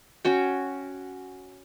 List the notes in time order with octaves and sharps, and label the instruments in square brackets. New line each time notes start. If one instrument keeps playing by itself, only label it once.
[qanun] C#4 F#4 G5